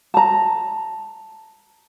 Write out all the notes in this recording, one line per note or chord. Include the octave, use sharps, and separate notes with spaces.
A5 A#5